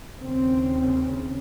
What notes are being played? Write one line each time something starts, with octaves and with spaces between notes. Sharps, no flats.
D#2 C#3 C4